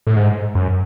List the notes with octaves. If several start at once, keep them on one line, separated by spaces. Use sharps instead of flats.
A2
G#2
F#2